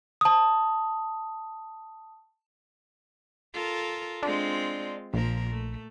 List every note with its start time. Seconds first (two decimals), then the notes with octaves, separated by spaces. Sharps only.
0.21 A5 D#6
3.54 F4 A4 A#4
4.23 G#3 C4 D4 F4
5.13 A#1 A#2 F3 A#4
5.50 A3